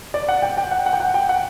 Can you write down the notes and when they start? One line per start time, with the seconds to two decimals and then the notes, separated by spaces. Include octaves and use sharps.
0.14 D5
0.29 F#5
0.42 G5
0.57 G5
0.71 F#5
0.86 F#5
0.93 G5
1.00 F#5
1.14 G5
1.29 F#5